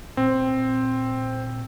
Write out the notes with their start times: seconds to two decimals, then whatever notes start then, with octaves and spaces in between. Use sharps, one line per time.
0.17 A#2 C4